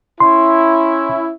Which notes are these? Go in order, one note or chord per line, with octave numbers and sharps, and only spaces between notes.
C#4 E4 C6